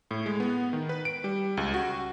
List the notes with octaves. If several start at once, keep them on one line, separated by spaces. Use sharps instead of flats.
A2
G#3
B3
D#3
B4
D7
G3
C#2
F#4